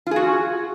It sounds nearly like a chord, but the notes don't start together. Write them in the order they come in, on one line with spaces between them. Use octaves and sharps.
F4 G#4 F#4